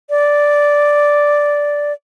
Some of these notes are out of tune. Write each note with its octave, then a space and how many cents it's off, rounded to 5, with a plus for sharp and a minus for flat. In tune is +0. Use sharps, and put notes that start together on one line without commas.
D5 -5